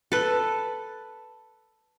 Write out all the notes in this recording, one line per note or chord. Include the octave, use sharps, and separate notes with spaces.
A4 B4